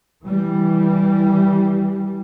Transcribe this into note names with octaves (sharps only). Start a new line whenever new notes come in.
E3 G3